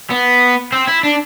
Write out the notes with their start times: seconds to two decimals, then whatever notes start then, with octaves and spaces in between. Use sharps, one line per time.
0.10 B3
0.72 C4
0.87 E4
1.03 D4